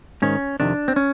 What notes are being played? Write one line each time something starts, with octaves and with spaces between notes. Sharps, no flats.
G#2 D#3 C#4
F2 C3 D#3 D4
C4
C#4